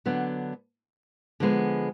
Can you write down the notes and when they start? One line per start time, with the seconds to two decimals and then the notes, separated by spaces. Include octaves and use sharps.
0.05 D3 F#3 B3 D4
1.40 D3 F3 G#3 B3